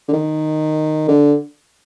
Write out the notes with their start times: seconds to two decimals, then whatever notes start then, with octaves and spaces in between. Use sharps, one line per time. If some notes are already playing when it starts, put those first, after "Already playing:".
0.08 D3
0.13 D#3
1.08 D3